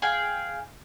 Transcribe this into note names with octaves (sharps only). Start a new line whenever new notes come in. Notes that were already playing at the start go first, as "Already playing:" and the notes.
G#4 F5 G5